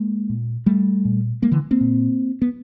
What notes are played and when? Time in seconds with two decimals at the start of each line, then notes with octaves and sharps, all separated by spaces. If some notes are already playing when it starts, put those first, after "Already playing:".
Already playing: G#3 A#3
0.29 A#2
0.66 G3 A3
1.05 A#2
1.42 G#3 A#3
1.51 D3 E3
1.71 A#3 C4
1.81 A#2
2.42 B3